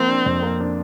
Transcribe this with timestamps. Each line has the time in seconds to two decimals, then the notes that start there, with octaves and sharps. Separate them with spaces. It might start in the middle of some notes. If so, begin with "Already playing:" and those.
Already playing: F3 A#3 C4
0.08 D4
0.26 F2
0.42 A#3
0.60 D4